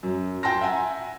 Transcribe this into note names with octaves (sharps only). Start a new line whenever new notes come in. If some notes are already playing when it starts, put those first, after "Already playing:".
F#2
G5 A5 C6 A#6
E5 F#5 G#5 A#5